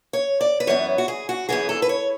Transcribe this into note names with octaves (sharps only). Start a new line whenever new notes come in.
C#5
D5
B4
F#2 E3 B3 C#5
F#4
G#4
F#4
F#2 E3 B3 G#4
A4
B4
C#5